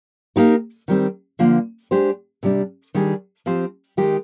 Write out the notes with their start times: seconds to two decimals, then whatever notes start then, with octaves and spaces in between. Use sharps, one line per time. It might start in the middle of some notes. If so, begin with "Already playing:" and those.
0.36 A#3 D#4 G4 A#4
0.88 D#3 G3 C4
1.39 D3 F3 A#3
1.91 G#3 D4 G4 C5
2.43 C3 G3 D4
2.94 D#3 G3 D4 G#4
3.46 F3 C4 G4 C5
3.97 D#3 G#3 D#4 G4